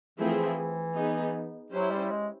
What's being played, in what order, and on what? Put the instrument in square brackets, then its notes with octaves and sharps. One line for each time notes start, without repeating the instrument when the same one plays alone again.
[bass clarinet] E3 [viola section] F3 A3 C4 E4 G#4
[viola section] B3 D#4 G#4
[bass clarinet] F#3 [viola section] C#4 E4 G4 C5
[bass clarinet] G3
G#3